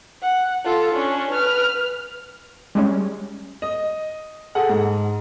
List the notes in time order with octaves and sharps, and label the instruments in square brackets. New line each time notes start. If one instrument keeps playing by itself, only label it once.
[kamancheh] F#5
F4 A4
C#4 D4
B4 F6
[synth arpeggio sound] G3 G#3 C#4
[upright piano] D#5
G#4 A4 F#5
G#2